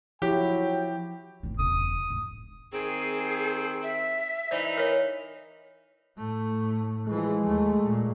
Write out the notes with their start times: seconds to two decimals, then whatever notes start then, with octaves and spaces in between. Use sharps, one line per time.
0.22 F3 F#3 E4 G4 G5
1.43 G#1 D#3
1.59 E1 C#3 D#6
2.10 G#2
2.72 D#3 C4 G#4
3.83 E5
4.51 E3 D#4 C5 D5
4.77 A#4 C#5
6.17 A2 A3
7.08 E3 F3 G#3
7.46 D#2 A3
7.83 A#2